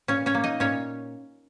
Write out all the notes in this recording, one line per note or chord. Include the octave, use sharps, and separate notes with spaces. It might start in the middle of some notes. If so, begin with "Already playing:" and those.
A#2 C#4 C#5
C#4 C#5
A#3
D#4 D#5
A#2 C#4 C#5